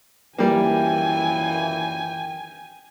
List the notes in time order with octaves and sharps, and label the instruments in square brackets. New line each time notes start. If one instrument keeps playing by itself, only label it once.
[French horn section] F#2 A#2 E3 [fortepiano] G3 A#3 [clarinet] G5 [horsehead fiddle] G#5